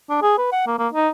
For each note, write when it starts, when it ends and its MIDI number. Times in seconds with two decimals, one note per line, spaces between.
0.10 0.18 62
0.22 0.33 68
0.38 0.48 71
0.52 0.63 78
0.67 0.74 58
0.79 0.88 58
0.94 1.09 63